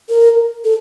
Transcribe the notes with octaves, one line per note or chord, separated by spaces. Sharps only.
A#4
A4